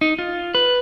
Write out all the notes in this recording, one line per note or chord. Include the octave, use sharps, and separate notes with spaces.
D#4
F4
B4